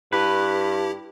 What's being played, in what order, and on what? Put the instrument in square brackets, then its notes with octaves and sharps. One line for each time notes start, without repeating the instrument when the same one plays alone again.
[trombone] G2 [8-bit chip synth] E4 G4 [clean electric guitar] B4